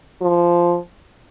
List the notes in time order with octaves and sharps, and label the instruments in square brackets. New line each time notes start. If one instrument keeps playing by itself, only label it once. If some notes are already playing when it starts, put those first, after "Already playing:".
[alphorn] F3